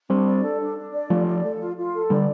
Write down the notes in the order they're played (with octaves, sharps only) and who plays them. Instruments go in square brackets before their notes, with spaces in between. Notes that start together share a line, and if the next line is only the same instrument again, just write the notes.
[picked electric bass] G3 C4 [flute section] D4
[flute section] D5
A4
D4
D4
D5
[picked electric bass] F3 A3 [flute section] F4
[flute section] D5
A4
F4
F4
A4
[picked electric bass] D3 G3 [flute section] D5